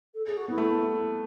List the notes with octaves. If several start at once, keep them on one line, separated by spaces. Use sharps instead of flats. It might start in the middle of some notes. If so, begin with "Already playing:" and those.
A4
G#4
F#4
B3 E4
A3